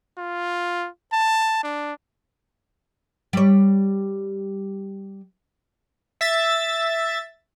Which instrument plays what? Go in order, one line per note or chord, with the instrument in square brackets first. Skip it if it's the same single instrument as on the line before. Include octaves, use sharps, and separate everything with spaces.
[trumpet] F4
A5
D4
[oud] G3 C#5
[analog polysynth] E5 A6